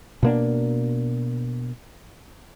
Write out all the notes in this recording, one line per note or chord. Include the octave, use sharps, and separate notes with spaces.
B2 A#3 D4